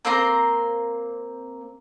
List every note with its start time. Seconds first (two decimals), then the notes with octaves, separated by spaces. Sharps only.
0.05 A#3 C4 A#5 C6